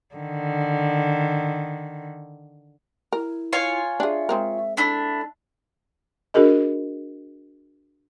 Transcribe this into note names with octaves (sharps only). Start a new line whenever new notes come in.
D3 D#3
E4 A#4
F4 C#5 G#5
D4 G#4 E5
G#3 C4 A#4
D4 E4 A4
D4 F#4 G#4 A#4 D#5